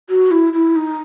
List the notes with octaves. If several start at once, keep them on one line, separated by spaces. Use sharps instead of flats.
F#4
E4
E4
D#4